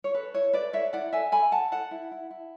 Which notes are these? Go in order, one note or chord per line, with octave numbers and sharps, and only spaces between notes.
C#5
A4 B4
E4 C#5
A4 B4 D5
A4 C#5 E5
E4 D5 F#5
A4 E5 G#5
A4 G#5 B5
A4 F#5 A5
A4 F#5 A5
E4
E4
E4